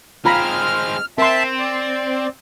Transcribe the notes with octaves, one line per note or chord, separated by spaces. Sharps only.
G#3 C4 F4 A#5 B5 F6
C4 A#4 E5 A5 C6
D5